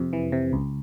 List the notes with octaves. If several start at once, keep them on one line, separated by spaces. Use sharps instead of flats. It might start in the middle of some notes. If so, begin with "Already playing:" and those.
Already playing: F2 C3
E3
C3
C#2